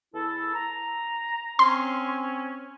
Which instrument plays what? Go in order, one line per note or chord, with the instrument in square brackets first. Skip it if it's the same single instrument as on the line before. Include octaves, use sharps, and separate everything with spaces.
[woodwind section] E2 E4 A4
A#5
[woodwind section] C4 C#4 [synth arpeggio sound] C6